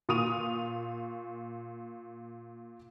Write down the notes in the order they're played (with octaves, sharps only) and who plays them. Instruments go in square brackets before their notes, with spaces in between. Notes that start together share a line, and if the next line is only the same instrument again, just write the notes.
[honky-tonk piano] A#2 C#6 D#6 D#7 F7